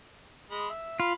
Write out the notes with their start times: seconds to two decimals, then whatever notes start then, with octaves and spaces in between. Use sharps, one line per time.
0.50 G#3 B5
0.69 E5
1.00 F4 F5 B5